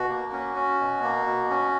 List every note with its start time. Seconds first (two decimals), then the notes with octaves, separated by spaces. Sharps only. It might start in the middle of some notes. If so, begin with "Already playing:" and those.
Already playing: B2 F#4
0.09 A#3
0.32 C#4
0.56 C#4
0.80 B2
1.03 A#3
1.26 B2
1.50 C#4